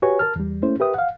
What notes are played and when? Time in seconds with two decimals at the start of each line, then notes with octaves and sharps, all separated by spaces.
0.02 F#4 G4 B4 C#5 G#5 C#6
0.19 A#4 A5 F6
0.36 E2 G3
0.62 A3 A#3 C#4 E4 C5
0.80 G4 A#4 B4 E5 G5 D#6
0.94 F5 F#5